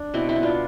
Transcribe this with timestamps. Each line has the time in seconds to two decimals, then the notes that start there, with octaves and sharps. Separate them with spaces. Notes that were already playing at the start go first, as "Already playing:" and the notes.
Already playing: D4
0.14 B2 C4 E4
0.29 C4 E4
0.36 B3
0.43 D4 F4